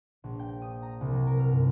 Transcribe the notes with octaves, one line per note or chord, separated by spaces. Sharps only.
A#1
G5
D#6
A#5
C2
F#3
A#4
F6
G1